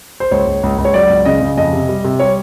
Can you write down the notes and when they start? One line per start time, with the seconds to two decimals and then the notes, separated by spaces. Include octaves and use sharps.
0.20 C5
0.31 C#2 C#5
0.47 C#2
0.63 C#2
0.78 C#2
0.85 C#5
0.94 F#3 D5
1.10 C#2
1.26 C#3 D#5
1.41 C#3
1.57 F2 D#5
1.73 C3
1.89 G3
2.04 C3
2.20 G3 C#5